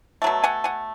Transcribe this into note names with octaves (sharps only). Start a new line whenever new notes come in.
B2 F#3 A3
F#5 G#5
F#5 G#5